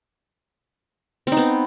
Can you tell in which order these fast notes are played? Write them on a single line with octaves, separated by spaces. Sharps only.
C4 D#4 B3